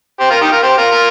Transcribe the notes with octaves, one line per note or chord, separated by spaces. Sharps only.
G4 C5
F4 A#4
D#4 G4
F4 A#4
G4 C5
F4 A#4
F4 A#4